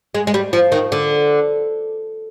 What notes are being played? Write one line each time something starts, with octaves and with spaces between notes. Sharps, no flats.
G#3
G#3
G3
F3
D#3
D3